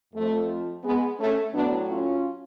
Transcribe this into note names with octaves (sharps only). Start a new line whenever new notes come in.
F2 F3 A3
G#3 B3
A3 C#4
A2 F#3 B3 D4
C#4 F4